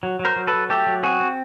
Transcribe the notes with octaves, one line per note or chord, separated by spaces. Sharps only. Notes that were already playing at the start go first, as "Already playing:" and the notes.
F#3
F#3
A#4 C5
F#3
A4 B4
F#3
A3 G4 A4
F#3
C4 F#4 G#4
C4